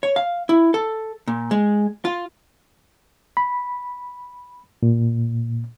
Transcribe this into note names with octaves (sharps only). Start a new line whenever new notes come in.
C#5
F5
E4
A4
A#2
G#3
F4
B5
A#2